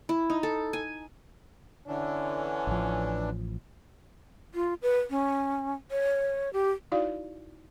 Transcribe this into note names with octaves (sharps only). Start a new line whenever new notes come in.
E4
D#4
A4
G#5
D3 E3 C#4 D4
A1 F3
F4
B4
C#4
C#5
G4
D#4 E4 F#4 D5 F5